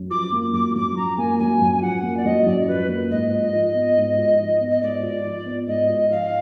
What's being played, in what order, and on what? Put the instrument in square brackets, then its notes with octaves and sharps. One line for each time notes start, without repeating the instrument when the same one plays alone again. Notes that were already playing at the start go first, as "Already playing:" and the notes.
Already playing: [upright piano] F#2
[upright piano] F3 [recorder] D6
[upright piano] A#3
[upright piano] F#2 [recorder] D6
[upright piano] F#2 [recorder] D6
[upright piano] F3 [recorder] A#5
[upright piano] A#3 [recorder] G#5
[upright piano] F#2 [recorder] G#5
[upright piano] F#2
[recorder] G#5
[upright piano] F3 [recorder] F#5
[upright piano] A#3
[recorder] D5
[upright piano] F#2 [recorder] D#5
[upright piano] F#2 [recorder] D5
[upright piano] F3 [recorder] B4
[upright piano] A#3
[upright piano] G#2 [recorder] D#5
[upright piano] F4
F3
B3
G#2
F4
F3
B3
[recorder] D#5
[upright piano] G#2 [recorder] D5
[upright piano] F4
F3
B3
[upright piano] G#2 [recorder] D#5
[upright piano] F4
[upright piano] F3 [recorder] F5